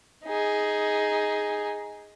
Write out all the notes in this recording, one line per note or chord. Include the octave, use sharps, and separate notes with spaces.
D#4 G#4